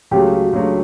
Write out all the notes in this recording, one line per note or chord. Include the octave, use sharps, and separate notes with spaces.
C#2 C#3 F#3 A3 G4
F#4
C#2 C#3 F#3 A3 D4